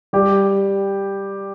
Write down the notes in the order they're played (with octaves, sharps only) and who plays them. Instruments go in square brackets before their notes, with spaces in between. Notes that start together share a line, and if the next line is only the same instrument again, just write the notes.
[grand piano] G3 G4